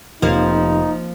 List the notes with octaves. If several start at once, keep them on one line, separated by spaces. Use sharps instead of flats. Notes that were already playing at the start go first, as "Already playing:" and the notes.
F1 F3 A#3 C4 D#4